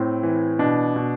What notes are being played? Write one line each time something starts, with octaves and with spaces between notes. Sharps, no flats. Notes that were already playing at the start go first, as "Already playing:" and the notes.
Already playing: A2 C4
E3
B2 D4
B2